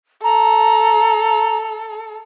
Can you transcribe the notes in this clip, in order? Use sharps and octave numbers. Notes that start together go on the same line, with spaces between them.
A4 A#5